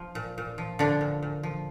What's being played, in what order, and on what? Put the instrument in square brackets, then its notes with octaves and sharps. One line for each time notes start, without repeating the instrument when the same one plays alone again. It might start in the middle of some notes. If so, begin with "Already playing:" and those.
Already playing: [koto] F3
A#2
A#2
F3
D3 F3 D4
A#2
A#2
F3